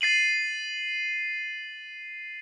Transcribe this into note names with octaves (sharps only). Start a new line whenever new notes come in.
A6 C7 D#7 F#7